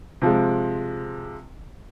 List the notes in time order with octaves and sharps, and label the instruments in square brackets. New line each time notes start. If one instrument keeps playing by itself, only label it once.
[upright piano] C3 F3 G#3